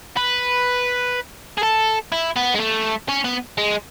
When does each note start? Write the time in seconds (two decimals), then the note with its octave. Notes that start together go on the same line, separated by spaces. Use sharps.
0.17 B4
1.58 G#4
1.63 A4
2.12 E4
2.36 B3
2.55 G#3
2.60 A3
3.09 C#4
3.25 B3
3.58 G#3